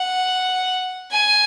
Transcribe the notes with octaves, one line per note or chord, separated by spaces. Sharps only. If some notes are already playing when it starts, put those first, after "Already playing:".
Already playing: F#5
G#5